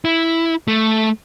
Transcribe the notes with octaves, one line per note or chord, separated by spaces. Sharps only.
E4
A3